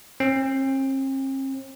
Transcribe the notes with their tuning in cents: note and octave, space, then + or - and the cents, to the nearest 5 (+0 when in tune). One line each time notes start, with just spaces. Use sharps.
C4 +45